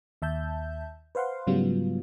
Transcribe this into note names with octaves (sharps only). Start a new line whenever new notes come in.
D#2 E5 A5 G6
B4 C5 F5 F#5 C6
G#2 C#3 F#3 G3 B3 F4